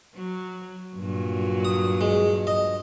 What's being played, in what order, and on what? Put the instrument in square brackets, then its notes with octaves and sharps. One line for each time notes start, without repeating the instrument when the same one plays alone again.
[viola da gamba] F#3
G2 A#2 F#3
[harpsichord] D#6
G#3
D#5